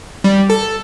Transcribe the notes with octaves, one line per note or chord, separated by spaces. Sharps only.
G3
A4